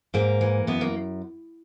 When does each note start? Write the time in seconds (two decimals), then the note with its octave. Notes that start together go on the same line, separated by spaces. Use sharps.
0.14 G#2 A#3
0.41 E3
0.67 F#2 B3
0.81 A#3